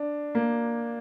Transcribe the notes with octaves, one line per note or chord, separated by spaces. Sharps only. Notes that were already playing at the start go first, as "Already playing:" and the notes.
Already playing: D4
A#3